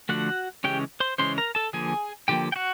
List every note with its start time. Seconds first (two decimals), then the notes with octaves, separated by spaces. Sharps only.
0.09 D3 F3 A3 F#4 F#5
0.64 C#3 E3 G#3 C#4 G4 G5
1.00 C5 C6
1.18 C#3 E3 G#3 C#4 C5 C6
1.38 A#4 A#5
1.55 A4 A5
1.73 D3 F3 A#3 G#4 G#5
2.28 D3 F3 A#3 G4 G5
2.52 G5
2.56 F#4 F#5